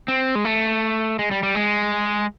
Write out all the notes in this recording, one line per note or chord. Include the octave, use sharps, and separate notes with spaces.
C4
G#3
A3
G#3
G3
G3
G#3